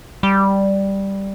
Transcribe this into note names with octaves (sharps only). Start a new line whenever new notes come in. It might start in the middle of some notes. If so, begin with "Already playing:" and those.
G3